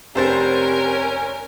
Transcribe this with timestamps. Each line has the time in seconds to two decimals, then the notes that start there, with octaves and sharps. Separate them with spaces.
0.15 F1 C3 C#4 A#4 C5 A6